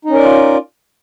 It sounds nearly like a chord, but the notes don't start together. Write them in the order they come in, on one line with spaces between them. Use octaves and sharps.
D#4 C#4 A#4 D5 F4